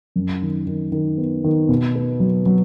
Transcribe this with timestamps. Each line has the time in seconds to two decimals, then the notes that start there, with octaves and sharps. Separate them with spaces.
0.16 F#2
0.42 D#3
0.67 D#3
0.92 D#3
1.18 B3
1.44 D#3
1.69 B2
1.96 B3
2.20 F#3
2.46 F#3